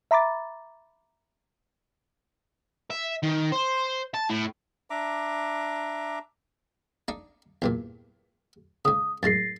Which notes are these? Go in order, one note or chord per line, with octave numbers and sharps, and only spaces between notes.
E5 A#5 B5 D6 A6
E5
D#3
C5
A5
A2
D4 E5 A#5 D6
D4 D#4
E2 G2 A#2
G#2 C#3 D#6
F#2 A2 G#3 A6 A#6 C7